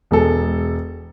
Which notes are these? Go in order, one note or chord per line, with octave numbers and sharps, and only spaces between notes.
E1 G#3 A4